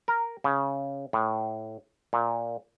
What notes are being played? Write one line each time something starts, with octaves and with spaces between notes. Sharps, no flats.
A#4
C#3
A2
A#2